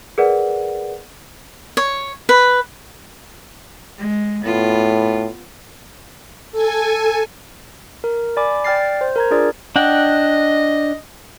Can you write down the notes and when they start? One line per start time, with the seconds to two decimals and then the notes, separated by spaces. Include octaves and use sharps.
0.18 G#4 A#4 B4 D5 F#5
1.77 C#5
2.29 B4
3.98 G#3
4.45 A2 B3 F4
6.52 A4 G#5
8.04 A#4
8.37 D5 G#5 B5 D6
8.64 D5 G5 F6 A6 C7
9.01 C5
9.16 A#4 A#5 G#6
9.31 D4 F4 G#4 A#4 D5
9.76 D4 D#5 F#5 G5